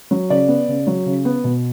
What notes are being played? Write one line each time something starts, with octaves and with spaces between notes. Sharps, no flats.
F#3
C#3 D5
B3
C#3
F#3
C#3
B3
B2